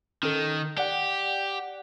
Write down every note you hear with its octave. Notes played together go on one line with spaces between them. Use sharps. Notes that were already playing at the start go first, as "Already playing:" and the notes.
D#3 C#4 A4
G4 D5 F#5 G5